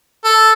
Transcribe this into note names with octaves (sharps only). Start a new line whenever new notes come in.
A4